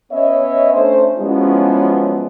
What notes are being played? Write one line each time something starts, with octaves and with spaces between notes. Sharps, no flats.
B3 C#4 C#5 D#5 E5
A3 C#4 D4 C5
F3 F#3 G#3 B3 C#4 E4